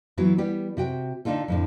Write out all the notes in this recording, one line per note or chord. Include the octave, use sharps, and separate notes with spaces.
E3 F#3 B3 E4 F#4
G3 B3 G4
C3 F#4 G5
D3 D4 D#4 F4 A4
F2 A2 D3